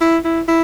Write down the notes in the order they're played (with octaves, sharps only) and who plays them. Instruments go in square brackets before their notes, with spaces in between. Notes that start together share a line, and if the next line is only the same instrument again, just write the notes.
[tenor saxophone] E4
E4
E4